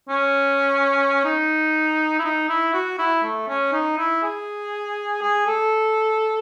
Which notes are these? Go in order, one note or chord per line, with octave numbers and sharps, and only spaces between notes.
C#4
D#4
E4
D#4
E4
F#4
E4
A3
C#4
D#4
E4
G#4
G#4
A4